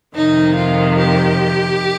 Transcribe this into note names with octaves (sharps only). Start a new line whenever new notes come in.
F2 C3 D#3 D#4
F4
G4